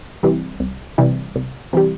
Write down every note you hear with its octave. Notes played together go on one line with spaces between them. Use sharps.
C3 E3 G3
C2
C3 E3 G3
C2
C3 E3 G3